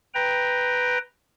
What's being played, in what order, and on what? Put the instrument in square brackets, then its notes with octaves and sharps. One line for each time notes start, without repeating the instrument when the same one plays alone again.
[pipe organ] B4 G5 A#5